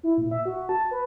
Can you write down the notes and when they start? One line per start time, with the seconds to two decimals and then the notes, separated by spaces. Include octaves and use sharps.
0.03 E4
0.18 A#2
0.31 E5
0.46 F#4
0.69 A5
0.91 B4